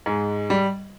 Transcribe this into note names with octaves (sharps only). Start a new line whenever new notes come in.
G#2 G#3
G3